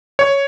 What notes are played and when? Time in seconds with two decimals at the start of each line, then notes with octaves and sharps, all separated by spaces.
0.19 C#5